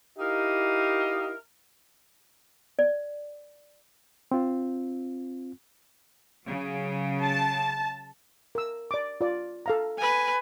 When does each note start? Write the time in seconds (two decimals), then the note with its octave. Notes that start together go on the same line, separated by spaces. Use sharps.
0.19 D#4 E4 G4 A#4 D#5 F5
2.79 D5
4.32 C4 F4
6.46 C#3 F#3
7.22 A5
8.55 A#4 E6
8.91 D5 D6
9.21 F4 D5
9.66 A4 F5 A#5
9.98 B4 G#5